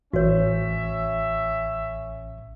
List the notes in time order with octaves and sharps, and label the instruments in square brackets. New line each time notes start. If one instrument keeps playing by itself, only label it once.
[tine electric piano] A1 [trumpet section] C#4 E5 [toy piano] F#4 C#5